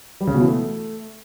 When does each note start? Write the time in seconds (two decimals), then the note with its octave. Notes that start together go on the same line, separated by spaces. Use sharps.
0.21 G3
0.27 C#3
0.34 B2
0.41 E3
0.48 A3